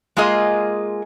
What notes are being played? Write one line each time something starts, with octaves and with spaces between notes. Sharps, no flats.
G#3 A#3 F4 G#4 D#5